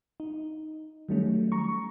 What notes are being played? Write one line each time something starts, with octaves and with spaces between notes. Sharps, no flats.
D#4
D#3 F#3 G3 A3 C#4
A#5 C#6